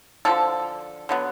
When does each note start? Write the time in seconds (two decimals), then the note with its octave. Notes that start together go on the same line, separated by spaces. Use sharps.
0.25 D3 F3 A#3 A4
1.09 D3 F#3 B3